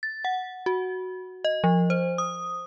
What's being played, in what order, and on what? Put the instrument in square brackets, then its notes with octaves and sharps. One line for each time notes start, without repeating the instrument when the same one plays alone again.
[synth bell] A6
F#5
F#4
D#5
F3
C5
D#6